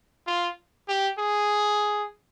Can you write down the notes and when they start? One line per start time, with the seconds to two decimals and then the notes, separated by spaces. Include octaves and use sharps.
0.27 F4
0.88 G4
1.19 G#4